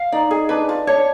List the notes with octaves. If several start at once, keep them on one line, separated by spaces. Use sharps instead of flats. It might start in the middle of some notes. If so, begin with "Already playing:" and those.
Already playing: F5
D#4 D5
G#4
D4 B4
F4
D4 C#5